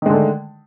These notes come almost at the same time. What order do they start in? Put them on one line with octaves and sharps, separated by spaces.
D#3 G#3 D3 A3